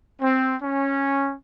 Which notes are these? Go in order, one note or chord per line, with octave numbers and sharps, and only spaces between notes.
C4
C#4